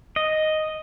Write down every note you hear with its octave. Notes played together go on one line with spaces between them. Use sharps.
D#5